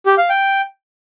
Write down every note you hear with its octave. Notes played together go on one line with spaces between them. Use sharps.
G4
F5
G5